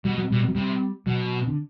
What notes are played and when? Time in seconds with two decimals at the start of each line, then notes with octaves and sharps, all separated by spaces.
0.05 B2 G3
0.18 F#3
0.30 B2 G3
0.48 F#3
0.55 C3 G3
1.07 B2 F#3
1.47 D3